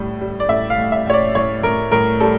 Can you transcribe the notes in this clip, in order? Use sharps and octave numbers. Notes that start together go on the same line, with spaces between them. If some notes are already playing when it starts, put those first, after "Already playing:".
Already playing: A2 G3
G3
D5
A2 E5
F5
A2
E5
A2 C#5
D5
A2 C#5
A2 A#4
A2 A#4
G3 A4